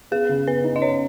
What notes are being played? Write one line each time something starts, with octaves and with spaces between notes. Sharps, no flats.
B3 G#4
C#3
B3 B4
D#4
D#5
B3 C#5